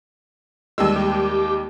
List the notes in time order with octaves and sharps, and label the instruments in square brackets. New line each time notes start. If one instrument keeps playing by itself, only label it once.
[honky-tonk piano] D#2 G3 G#3 [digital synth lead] E6
[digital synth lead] G4